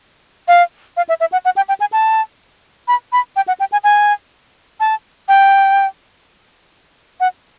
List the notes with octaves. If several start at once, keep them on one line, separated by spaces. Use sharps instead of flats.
F5
F5
E5
E5
F#5
F#5
G5
G5
G#5
A5
B5
B5
G5
F#5
G5
G#5
G#5
A5
G5
F#5